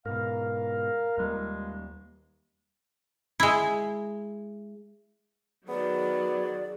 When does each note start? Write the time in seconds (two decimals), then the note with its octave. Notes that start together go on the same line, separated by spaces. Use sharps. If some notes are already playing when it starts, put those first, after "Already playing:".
0.06 G#2 B2 A#4 F5
1.18 D#2 G3 G#3 A#3
3.40 G#3 E4
5.68 D#3 F#3 B3 G#4 D5